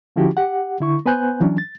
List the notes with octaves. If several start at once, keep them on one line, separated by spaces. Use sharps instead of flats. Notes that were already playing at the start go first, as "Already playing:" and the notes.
D3 F3 C#4 E4 F#4 G4
G4 F#5
D3 E4 C#6
B3 B4 C5 G#5 F#6 G6
E3 F#3 C#4 D4
A6